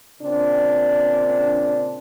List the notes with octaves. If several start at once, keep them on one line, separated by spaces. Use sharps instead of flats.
A#2 C#3 C4 D4